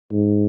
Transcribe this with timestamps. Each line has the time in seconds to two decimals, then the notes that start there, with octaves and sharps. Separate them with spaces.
0.12 G#2